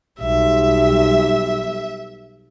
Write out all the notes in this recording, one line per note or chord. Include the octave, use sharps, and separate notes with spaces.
B1 G3 E5